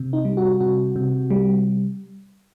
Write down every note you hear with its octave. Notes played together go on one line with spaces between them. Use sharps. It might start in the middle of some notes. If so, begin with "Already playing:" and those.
Already playing: C3
D#4
G3
F#4
C3 F#4
C3
G3